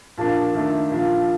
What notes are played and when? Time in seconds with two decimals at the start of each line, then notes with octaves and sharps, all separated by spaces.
0.17 A#2 F3 A#3 D4 A5
0.55 D#3 A3 D4
0.90 A#2 F3 A#3 D4